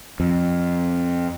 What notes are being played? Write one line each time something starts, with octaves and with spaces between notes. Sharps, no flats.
F2